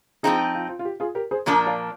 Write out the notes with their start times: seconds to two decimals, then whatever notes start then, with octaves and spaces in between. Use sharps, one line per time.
0.23 F3 C4 D#4 F4 G#4
0.55 F4
0.68 F4
0.79 F4
0.85 G4
1.00 F4 G#4
1.15 G4 A#4
1.31 G#4 C5
1.46 A#2 F3 A#3 D4 A#4 D5
1.67 D5 F5